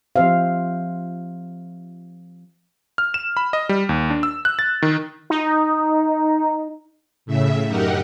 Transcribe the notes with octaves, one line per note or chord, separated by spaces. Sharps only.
F3 C4 G4 C5 E5 F5
F6
E7
B5
D#5
G3
D#2
D4
E6
F#6
A6
D#3
D#4
A2 C#3 E5
F#2 D#4 G4 A#4 F#5